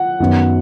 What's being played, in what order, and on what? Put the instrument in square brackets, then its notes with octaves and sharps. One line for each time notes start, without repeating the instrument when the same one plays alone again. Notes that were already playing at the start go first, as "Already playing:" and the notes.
Already playing: [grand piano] F#5
F#2 D#3 F#3 B3